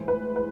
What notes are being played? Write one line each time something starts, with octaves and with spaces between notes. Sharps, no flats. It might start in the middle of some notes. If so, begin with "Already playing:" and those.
Already playing: A2 E3 G#3 C5
B4
B4